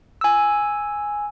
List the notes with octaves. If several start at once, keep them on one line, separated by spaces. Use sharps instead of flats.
G#5 E6